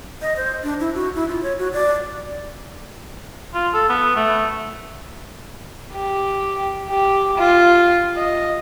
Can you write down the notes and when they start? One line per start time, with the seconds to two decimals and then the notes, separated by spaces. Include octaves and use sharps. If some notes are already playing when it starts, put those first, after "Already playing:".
0.22 D#5
0.37 C5
0.63 D4
0.80 E4
0.95 F#4
1.15 E4
1.28 F4
1.43 C#5
1.58 F#4
1.73 D5
3.54 F4
3.74 A4
3.89 B3
4.16 A3
5.93 G4
6.90 G4
7.38 F4
8.17 D#5